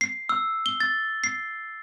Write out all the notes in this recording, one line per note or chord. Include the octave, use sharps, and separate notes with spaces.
C7
E6
G7
A6
C7